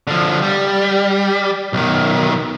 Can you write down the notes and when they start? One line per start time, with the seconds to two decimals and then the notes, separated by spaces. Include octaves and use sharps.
0.07 D3 F3
0.42 G3
1.73 B1 D#3